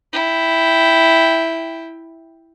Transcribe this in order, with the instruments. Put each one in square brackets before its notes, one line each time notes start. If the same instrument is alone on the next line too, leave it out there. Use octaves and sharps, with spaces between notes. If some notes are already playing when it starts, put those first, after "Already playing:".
[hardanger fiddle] E4 G5